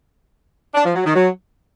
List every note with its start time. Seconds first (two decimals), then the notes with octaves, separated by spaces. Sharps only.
0.74 D4
0.84 F3
0.94 F#3
1.04 D#3
1.14 F#3